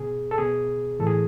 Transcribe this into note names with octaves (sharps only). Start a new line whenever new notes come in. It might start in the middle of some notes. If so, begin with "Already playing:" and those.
Already playing: B2 G#4
A4
B2 G#4
A2 E3 A4
G#4